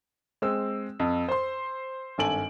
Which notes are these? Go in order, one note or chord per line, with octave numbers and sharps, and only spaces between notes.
G#3 C4 E6
F2
C5 C6
G#1 G2 A4 G#5 D7 F#7